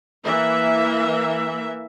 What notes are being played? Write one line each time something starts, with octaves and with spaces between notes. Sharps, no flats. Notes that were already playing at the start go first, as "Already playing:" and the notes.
E3 A#3 E5